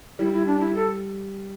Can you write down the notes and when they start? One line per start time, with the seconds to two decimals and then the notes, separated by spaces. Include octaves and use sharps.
0.19 G3 E4
0.33 E4
0.46 D4
0.60 E4
0.75 A4